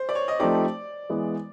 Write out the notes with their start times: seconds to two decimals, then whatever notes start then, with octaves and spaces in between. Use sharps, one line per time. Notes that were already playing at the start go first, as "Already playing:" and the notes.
Already playing: C5
0.09 D5
0.15 C#5
0.28 D#5
0.40 F3 A3 C4 D#4 G4 D5
1.09 E3 G#3 B3